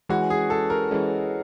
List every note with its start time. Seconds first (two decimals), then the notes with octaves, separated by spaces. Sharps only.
0.09 E3 G#3 C#4 F#4
0.30 G#4
0.50 A4
0.70 A#4
0.91 E3 G#3 C#4